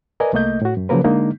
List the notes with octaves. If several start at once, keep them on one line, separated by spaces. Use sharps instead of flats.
A#4 B4 D5 D#5 G#5
C2 A3 A#3 D#5 G6
A2 F#4
F#2
C#3 F3 F#3 A#3 A#4 B4
D3 G#3 A#3 D4 D#4